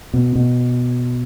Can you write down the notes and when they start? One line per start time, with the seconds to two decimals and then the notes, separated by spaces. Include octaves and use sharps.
0.14 B2
0.35 B2